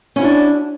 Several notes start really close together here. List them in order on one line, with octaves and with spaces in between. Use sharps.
C#4 E4 F#4 D4